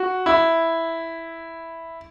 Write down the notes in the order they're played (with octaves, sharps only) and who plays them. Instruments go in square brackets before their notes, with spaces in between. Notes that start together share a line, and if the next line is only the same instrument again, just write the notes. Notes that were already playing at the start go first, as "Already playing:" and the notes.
Already playing: [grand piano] F#4
E4